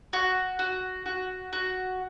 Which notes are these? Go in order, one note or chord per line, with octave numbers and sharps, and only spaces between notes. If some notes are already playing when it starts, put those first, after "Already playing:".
F#4
F#4
F#4
F#4